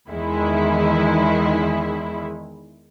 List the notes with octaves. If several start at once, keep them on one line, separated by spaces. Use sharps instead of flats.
E2 D#3 G#3 E4